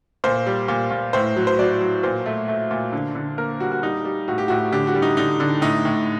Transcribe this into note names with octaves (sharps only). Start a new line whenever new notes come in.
A#2 C5
G3
A#2
A#2
A2 C5
F#3
C5
F#3 D5
F#3
A#2 C5
A3
A3
A#2
D3
D3
A#3 A#4
G3 F#4
F#4
G3 D#4
G3
A2 F#4
G4
A2 F#4
D3 G4
F#4
G3
D#4
D3 D#4
D3
A2 D#4
A2